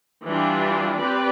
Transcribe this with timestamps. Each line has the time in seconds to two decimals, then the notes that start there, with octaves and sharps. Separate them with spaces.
0.24 E3 G3 D4 F4
1.00 C4 G4 B4 D5